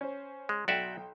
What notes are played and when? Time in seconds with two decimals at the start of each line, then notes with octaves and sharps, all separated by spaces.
0.01 C#4 C5
0.49 G#3
0.68 B1 F#4 D5 E5 G5